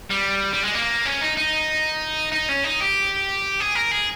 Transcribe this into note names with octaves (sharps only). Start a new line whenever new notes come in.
G3
G3
G#3
A#3
C#4
D#4
D#4
D#4
C#4
D#4
G4
G#4
A#4
G#4